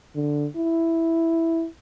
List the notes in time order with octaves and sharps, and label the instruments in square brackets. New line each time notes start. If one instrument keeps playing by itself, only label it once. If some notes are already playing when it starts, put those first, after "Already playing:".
[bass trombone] D3
E4